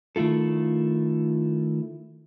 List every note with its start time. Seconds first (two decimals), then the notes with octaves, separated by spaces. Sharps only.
0.16 D#3 A3 E4 F4 A4